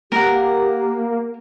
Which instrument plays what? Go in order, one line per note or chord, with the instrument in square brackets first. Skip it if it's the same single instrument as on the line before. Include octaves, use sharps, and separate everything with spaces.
[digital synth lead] A#3 [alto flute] G4 [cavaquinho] A#4 F#5